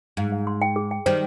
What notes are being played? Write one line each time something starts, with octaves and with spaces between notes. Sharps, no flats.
G#2 F5
F5
C6
G5
G#4
G5
D#3 G3 C5